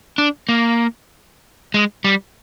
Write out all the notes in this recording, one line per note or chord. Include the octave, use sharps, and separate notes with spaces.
D4
A#3
G#3
G3